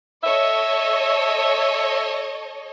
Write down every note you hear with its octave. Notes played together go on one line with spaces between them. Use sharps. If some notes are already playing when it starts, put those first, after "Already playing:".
A4 C#5 D#5 E5